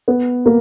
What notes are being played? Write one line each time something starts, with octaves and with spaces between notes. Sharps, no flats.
B3
A#3